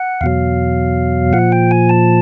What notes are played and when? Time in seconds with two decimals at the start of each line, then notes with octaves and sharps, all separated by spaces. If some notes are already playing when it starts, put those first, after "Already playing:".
Already playing: F#5
0.21 E2 B2 F#3 F5
1.33 A#2 F3 F#5
1.52 G5
1.71 G#5
1.89 A5